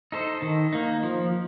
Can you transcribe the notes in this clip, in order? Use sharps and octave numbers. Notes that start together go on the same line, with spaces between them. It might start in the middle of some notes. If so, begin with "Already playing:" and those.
D#4 A4 C5
D#3
A#3 D#4
F3